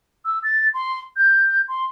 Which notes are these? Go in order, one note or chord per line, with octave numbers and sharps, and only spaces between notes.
E6
A6
C6
G6
C6